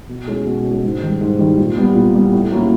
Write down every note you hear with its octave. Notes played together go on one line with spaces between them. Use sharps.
B2
G#3 C#4
B2
G#3 C#4
G#2
D#3 G3
G#2
D#3 G3
A#2
G3 B3
A#2
G3 B3
A2
F#3 A#3 C#4 E4